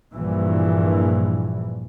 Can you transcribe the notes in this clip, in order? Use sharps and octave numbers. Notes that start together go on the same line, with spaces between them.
A#1 G2 A#2 E3